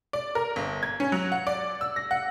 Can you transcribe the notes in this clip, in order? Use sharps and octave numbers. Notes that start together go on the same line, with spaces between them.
D5
A#4
G1
G#6
C#4
F#3
F#5
D5
E6
A#6
F#5